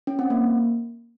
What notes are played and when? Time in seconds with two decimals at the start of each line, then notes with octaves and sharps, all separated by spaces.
0.07 C#4
0.19 C4
0.30 A#3